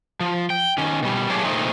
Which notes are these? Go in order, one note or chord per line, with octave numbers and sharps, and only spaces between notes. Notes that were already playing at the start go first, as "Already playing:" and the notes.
F3
G5
D#3 C#4
B2 G3
F#3 A3 A#3 D4 G4 G#4
A#2 D#3 F3 A3 C4 D#4